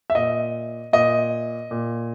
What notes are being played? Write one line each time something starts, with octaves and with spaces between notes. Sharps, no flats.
E5
A#2 D#5
A#2 D#5
A#2